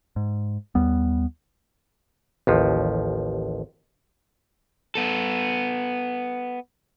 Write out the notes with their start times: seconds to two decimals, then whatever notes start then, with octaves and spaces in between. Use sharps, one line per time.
0.16 G#2
0.75 D#2 G3 B3
2.47 A1 D#2 F3
4.95 B3 A4